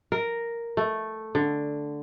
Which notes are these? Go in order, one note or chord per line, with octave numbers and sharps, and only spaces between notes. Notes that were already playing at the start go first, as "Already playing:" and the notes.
A#4
A3
D3